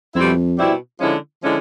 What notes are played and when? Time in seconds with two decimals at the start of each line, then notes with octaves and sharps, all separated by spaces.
0.15 F2 B2 G3 C4 E4
0.58 B2 G3 C4 E4
1.00 D3 F3 G#3 C#4 E4
1.42 D3 F3 G#3 C#4 E4